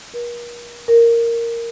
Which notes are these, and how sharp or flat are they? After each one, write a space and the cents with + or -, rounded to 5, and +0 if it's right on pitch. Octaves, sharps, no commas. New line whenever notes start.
A#4 +40
A#4 -5